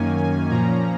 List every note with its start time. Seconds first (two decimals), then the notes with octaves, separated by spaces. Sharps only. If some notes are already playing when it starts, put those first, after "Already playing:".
Already playing: F#2 D#3 A#3 C#4 G#5
0.17 G#5
0.51 A#2 F3 A#3 C#4 A#5